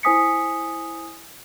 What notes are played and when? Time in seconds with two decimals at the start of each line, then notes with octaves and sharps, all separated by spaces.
0.03 E4 C5 G#5 D#6 B6 C#7